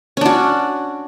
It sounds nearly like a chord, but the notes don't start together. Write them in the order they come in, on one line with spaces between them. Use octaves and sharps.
C#4 D4 F#4